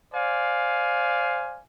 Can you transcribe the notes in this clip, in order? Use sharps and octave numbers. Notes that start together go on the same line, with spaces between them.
C5 D5 F5 G#5